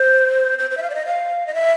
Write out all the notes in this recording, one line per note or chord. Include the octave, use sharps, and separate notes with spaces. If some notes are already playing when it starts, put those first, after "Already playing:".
Already playing: C5
C5
C5
E5
F5
D5
D#5
F5
D#5
E5